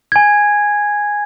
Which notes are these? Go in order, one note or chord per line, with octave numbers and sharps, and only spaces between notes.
G#5 G#6